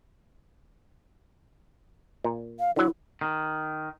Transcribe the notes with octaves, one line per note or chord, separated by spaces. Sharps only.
A#2
F5
D3 F#3 E4
D#3